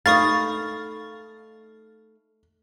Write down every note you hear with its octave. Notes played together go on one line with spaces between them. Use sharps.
A3 D#4 F5 B5 C#6 D#6 A6